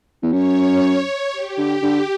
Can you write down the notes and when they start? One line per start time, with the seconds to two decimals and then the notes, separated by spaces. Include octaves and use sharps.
0.23 E2
0.32 F#2 C#5
1.32 G4
1.58 D3
1.82 D3